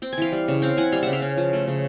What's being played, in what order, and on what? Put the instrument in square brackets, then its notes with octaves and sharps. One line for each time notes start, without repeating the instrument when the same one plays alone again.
[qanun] C4 G5
G#5
E3 F5 G5
G3
C#3
C4 F5 G5
E3 F#5 G#5
G3 F5 G5
C#3 E5 F#5
F5 G5
C#4
F3
A3
C#3